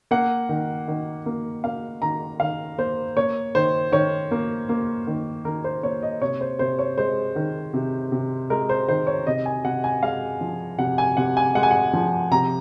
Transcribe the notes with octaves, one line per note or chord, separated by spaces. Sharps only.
A#3 F#5
D#3
D#3
A#3
A#3 F5
D#3 A#5
D#3 F5
A#3 C5
A#3 C#5
D#3 C5
D#3 C#5
A#3
A#3
D#3
D#3 A#4
C5
A#3 C#5
D#5
C3 C#5
C5
C3 C5
C#5
G#3 C5
D#3
C3
C3
G#3 A#4
C5
D#3 C5
C#5
C3 D#5
G#5
C3 F#5
G#5
G#3 F5
F3
C3 F#5
G#5
C3 F#5
G#5
G#3 F#5
G#5
F#5
F3
C3 A#5